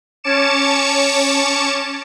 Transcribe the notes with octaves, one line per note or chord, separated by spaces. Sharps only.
C#4 C#5 A5 D6 C#7 E7